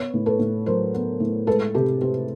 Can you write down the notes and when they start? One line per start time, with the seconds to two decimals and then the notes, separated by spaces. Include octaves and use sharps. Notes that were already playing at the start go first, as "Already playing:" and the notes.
Already playing: B3 B4 C#5
0.14 A2
0.26 A4 B4
0.39 A2
0.66 F#3 A#4 C5
0.94 B3
1.20 A2
1.47 G#3 A4 B4
1.75 C3 G4 A4
2.01 C4 G4